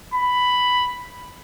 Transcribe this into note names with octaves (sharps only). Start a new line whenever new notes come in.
B5